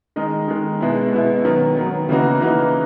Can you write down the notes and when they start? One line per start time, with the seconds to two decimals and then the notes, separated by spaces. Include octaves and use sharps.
0.16 D#3 G#3 D#4
0.48 D#3 G#3 D#4
0.81 B2 G#3 B3 E4
1.13 B2 G#3 B3 E4
1.45 D#3 F#3 B3
1.77 D#3 F#3 B3
2.09 C#3 E3 A#3 D#4 F#4
2.41 C#3 E3 A#3 D#4 F#4